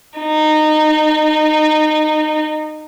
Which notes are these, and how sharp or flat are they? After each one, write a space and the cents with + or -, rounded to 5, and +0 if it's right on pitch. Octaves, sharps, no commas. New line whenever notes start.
D#4 -20